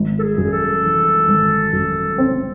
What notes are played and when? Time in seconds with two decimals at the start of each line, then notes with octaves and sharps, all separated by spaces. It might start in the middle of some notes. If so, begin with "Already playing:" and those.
Already playing: G#1
0.19 A4
0.23 G#4
0.38 F#2
0.53 A4
0.84 E3
1.28 G#1
1.73 F#2
2.18 C4